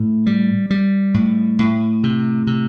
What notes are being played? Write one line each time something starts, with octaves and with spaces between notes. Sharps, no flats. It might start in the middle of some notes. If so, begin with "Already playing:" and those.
Already playing: A2
G3
G3
A2
A2
C3
C3